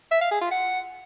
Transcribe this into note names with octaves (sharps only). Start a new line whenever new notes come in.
E5
F5
G#4
F4
F#5